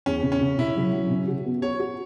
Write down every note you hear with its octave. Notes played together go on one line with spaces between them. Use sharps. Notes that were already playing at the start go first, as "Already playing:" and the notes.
E2 C#4
C#3
C#4
C#3
C#3 E4
F#3
F#3
C#3
F#4
B3
F#4 C#5
F#4